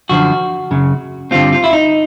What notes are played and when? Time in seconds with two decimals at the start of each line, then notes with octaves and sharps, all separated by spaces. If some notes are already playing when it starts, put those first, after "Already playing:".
0.09 F#2 D3 F3 F#4
0.71 F#2 C#3 F#3
1.31 G2 D3 G3 C4 F4
1.53 F4
1.64 E4
1.73 D#4